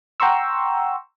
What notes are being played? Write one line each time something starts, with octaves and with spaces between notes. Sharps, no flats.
F#5 G5 A#5 C6 C#6 E6